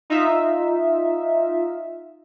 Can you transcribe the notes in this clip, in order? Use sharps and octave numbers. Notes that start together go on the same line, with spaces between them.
D#4 F4 E5